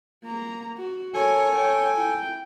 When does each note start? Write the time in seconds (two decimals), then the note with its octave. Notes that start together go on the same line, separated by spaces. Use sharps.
0.23 A#3 A#5
0.77 F#4
1.14 A4 A#4 C#5 G#5
1.55 C#5 G5
1.96 E4 G5